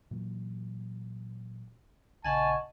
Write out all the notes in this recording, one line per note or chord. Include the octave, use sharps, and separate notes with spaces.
A#2 E3 F#3
A#1 C#3 D#5 F#5 G#5 A5 C#6